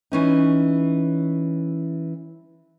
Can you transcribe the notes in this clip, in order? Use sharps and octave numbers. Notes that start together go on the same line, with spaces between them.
E3 C#4 D#4